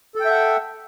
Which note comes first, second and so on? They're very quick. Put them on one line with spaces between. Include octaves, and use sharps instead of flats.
A4 G5 E5 F#5